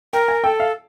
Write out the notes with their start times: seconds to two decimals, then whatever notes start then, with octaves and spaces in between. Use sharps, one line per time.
0.13 A#4 G5
0.28 G#5
0.44 A4 G5
0.60 F5